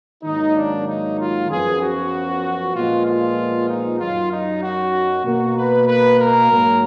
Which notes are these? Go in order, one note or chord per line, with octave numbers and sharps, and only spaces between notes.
G#2 D#3 F#3 A#3 D#4
D4
D#4
F4
F#2 F3 B3 G#4
F#4
A#2 F3 G#3 B3 F4
F4
D#4
F#2 D#3 F#3 F4
D#4
F#4
B2 A#3 F#4
B4
B4
A#4
G#2 F#3 A#3